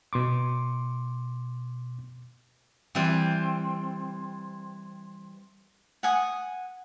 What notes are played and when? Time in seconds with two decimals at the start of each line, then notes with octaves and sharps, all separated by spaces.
0.13 B2 C6 D6
2.95 E3 G3 C4
6.03 F#5 G#5 D#6